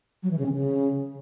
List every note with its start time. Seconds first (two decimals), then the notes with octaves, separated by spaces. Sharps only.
0.23 F#3
0.30 E3
0.38 C#3
0.46 C#4
0.53 C#3